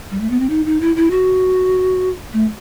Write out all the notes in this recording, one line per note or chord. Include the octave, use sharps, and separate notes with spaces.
G3
A3
B3
C4
D#4
D#4
E4
E4
F#4
A3